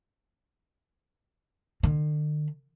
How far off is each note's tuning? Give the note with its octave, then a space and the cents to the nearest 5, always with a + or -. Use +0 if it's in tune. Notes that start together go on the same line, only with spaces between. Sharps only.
D3 +45